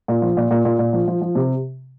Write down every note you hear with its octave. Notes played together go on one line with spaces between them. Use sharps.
A#2
F3
A#2
A#2
A#2
A#2
F3
F3
F3
C3